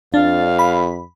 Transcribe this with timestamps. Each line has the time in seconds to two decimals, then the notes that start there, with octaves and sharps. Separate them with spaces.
0.14 F2 D4 F5
0.59 B5